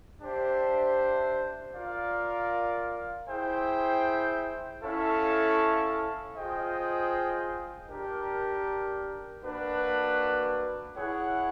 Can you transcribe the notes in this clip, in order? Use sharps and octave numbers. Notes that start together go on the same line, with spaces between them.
D4 G4 C5 E5
F4 A#4 D5 F5
E4 G#4 C5 E5 G5
C#4 E4 A4 C#5 F5
F4 G#4 C5 D#5 G5
D4 G4 A#4
A#3 D4 F#4 B4
E4 G#4 C#5 F#5